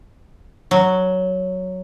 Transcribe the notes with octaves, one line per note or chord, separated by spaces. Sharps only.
F#3